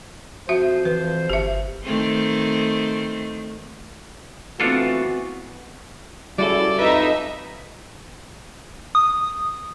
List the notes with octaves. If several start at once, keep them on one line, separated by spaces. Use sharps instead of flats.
F2 F3 F#4 C5 E5
E3 B4
G1 G4 E5
D#3 A3 C4
E3 A3 B3 C4 D4 F4 F#4 A4
C#3 G3 E4 F#4 A4 D5
F2 D#4 B4 E5
D#6